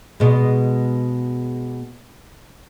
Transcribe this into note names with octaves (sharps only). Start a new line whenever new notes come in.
B2 G#3